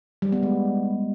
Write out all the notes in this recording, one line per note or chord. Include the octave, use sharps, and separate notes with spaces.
G3
B3
G#3